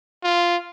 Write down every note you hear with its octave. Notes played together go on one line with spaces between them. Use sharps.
F4